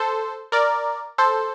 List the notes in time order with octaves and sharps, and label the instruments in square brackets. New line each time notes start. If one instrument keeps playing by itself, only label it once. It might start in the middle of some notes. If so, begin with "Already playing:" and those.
Already playing: [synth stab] A4 C5
A#4 D5
A4 C5